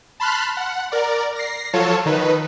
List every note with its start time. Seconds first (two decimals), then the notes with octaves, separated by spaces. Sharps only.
0.20 A5 B5 C6 F6 F#6
0.57 F#5
0.92 A#4 D5
1.36 A#6 C7
1.73 F3 F#3 F4 A4 C#5 A5
2.06 D#3 D#4 B4